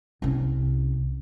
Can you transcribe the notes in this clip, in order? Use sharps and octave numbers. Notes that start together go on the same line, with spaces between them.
C2 C#4